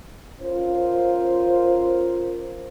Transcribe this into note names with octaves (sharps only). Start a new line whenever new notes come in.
C#4 F4 A#4 C5